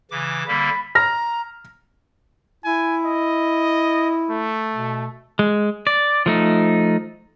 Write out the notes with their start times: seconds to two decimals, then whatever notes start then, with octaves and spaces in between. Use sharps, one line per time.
0.11 C#3 E3 D6
0.48 D3 G3 A#3 B5
0.95 A#5 F6 A#6
2.65 E4 G#5
3.06 D#5
4.30 A3
4.74 B2
5.39 G#3
5.87 D5
6.26 F3 A3 D#4